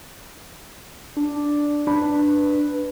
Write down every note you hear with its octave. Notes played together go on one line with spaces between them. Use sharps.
D4
D4 B4